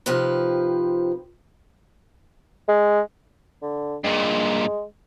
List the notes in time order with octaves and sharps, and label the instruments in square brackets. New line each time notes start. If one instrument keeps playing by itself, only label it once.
[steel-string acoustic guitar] C3 D#3 F3 G4 B4
[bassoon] G#3
D3
[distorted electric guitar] G2 A#2 [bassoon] G#3